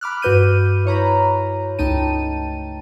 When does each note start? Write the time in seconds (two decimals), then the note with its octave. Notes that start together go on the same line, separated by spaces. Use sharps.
0.01 B5 D6 F6 F#6
0.22 G2 F#4 B4 G6 D#7
0.85 E4 C#5 A#5 B5
1.79 C#2 A3 D#4 G5 A5 D#7